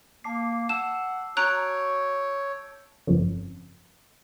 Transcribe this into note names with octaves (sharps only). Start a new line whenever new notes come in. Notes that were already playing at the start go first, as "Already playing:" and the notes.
A#3 A5 D6 C7
F#5 A5 E6 E7
F#4 C#5 A#5 F#6 G6 D7
G1 F2 C#3